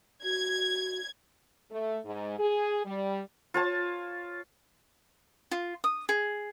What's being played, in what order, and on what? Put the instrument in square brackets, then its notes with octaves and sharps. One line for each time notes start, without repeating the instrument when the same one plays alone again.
[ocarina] F#4 [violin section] G#6
[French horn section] A3
G#2
G#4
G3
[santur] F4 C#5 A5
[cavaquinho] F4
D#6
G#4